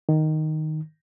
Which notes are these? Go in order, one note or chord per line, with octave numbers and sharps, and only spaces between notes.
D#3